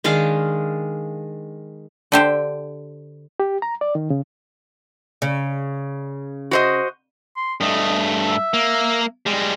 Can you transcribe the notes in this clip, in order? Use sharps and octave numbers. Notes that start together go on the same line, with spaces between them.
D#3 G#3 D4 F5
D3 G4 C5
G4
A#5
D5
D#3
C#3
C#3
F#4 C5 D#5
C6
G2 A3 D#5
E5
A#3
G3 G#3